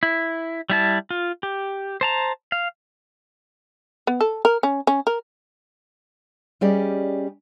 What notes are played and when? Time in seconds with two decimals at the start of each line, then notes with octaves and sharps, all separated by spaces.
0.03 E4
0.70 G3 E4 A5
1.10 F4
1.43 G4
2.01 C5 A5 A#5
2.52 F5
4.07 B3
4.21 A4
4.45 A#4
4.63 C#4
4.87 C#4
5.07 A#4
6.61 G3 C#4 G4 G#4 D5 D#5